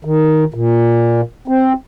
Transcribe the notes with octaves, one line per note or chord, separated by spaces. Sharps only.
D#3
A#2
C4